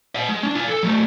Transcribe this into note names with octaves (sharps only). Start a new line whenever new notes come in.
D#5 F#5
G#3
C#4 D4
F4 G#5
A4
F#3 A3